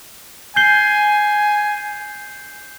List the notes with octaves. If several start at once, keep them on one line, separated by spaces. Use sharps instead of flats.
G#5 G6 C7 G7